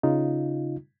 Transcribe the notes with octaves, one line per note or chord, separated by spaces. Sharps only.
C#3 D#4 F4